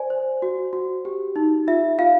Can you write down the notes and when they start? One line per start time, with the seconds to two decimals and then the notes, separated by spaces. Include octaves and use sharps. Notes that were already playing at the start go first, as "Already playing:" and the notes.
Already playing: C5 D5 G#5
0.10 C5
0.42 F#4
0.73 F#4
1.05 G4
1.36 D#4
1.67 F4 E5
1.98 F4 F5